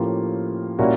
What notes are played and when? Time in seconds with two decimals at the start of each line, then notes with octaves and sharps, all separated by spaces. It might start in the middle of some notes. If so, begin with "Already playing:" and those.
Already playing: A2 F3 A#3 C#4 F4 G4
0.79 A#2 G3 A#3 C#4 E4 F#4